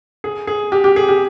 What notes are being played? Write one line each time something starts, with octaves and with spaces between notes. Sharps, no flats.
G#4
G#4
G4
G4
G#4
G4